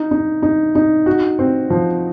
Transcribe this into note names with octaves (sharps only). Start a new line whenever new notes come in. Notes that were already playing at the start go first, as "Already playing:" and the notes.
Already playing: D#4
D#4
D#4
D#4
F#4
C4
F3